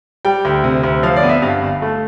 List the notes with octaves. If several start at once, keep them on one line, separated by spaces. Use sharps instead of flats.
G3 G5
D2
C3
D2
F3 F5
D5
B3
E5
G2 F5
G1
A3